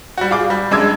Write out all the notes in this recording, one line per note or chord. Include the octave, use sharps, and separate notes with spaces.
G3 F#4
F4 G#4 D6
G3
F#2 G#3 D4 D6 E6 G#6